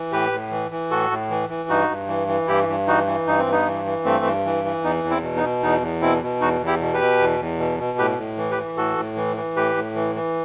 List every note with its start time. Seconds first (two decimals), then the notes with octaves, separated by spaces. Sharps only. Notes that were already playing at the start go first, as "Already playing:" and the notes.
Already playing: E3
0.12 A2 G4 B4
0.32 A2
0.51 E3
0.71 E3
0.91 A2 F#4 A4
1.11 A2
1.30 E3
1.49 E3
1.69 G2 D#4 F#4
1.89 G2
2.08 E3
2.28 E3
2.47 G2 E4 G4
2.68 G2
2.87 E3 D#4 F#4
3.06 E3
3.27 G2 D#4
3.39 C4
3.46 G2
3.51 B3 D#4
3.66 E3
3.85 E3
4.05 G2 A3 C4
4.25 G2
4.45 E3
4.65 E3
4.84 E2 B3 D#4
5.04 E2
5.10 C4 E4
5.23 B2
5.36 B3 D#4
5.43 B2
5.63 E2 B3 D#4
5.82 E2
6.01 B2 C4 E4
6.22 B2
6.41 E2 D#4 F#4
6.61 E2
6.67 E4 G4
6.80 B2
6.94 G4 B4
7.01 B2
7.19 E2
7.39 E2
7.59 B2
7.79 B2
7.98 A2 G4 B4
8.18 A2
8.37 E3
8.51 G4 B4
8.58 E3
8.77 A2 F#4 A4
8.97 A2
9.17 E3
9.37 E3
9.56 A2 G4 B4
9.75 A2
9.95 E3
10.15 E3